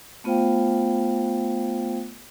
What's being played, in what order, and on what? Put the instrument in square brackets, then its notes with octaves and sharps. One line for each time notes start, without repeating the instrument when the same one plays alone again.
[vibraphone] A3 B3 F4 C5 F5 G5